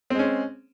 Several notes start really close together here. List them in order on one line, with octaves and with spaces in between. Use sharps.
C4 G#3 C#4